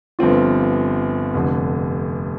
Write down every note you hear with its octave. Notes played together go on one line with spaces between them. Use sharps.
G1 G2 F3 C4 F4
F1 F2 D3